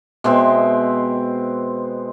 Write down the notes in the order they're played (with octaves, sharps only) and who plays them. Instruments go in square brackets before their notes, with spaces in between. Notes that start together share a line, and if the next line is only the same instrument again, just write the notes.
[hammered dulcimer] B2 G#3 C4 E5